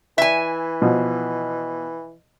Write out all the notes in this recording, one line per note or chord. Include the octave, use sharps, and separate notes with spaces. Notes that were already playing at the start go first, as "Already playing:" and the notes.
E3 E5 G#5
B2 F3